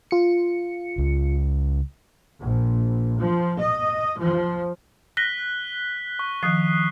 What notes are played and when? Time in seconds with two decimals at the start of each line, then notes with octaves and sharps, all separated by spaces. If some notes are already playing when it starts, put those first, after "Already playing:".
0.11 F4 C#7
0.98 C#2
2.41 A#1
3.19 F3
3.60 D#5
4.19 F3
5.17 F#6 A#6 B6 G7
6.19 C#6
6.43 D#3 F3 D#6 F#6 C7